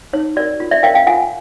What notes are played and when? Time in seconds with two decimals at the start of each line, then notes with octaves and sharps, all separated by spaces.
0.13 D#4 C#5
0.36 F#4 A#4 C#5 D5
0.60 F4
0.71 D5 E5
0.83 A#4 C#5 F5 G5
0.94 F5 G5
1.07 F4 F#5 G#5